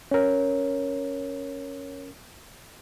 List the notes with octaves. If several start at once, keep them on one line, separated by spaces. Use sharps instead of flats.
C#4 A#4 C#5